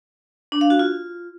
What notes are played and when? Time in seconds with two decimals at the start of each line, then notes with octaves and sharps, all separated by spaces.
0.52 D4
0.61 F5
0.70 F#4
0.79 F4